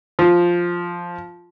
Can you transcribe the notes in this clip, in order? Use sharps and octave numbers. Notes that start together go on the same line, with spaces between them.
F3